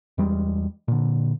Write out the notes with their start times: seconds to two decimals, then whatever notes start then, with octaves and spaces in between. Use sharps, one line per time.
0.18 E2 G3 G#3
0.88 A#2 D3